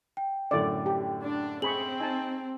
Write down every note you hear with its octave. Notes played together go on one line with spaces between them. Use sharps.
G5
F#2 A2 D3 D5
G4
D4
C4 G#4 B5 C#6 F#7
D#4 G#5 A5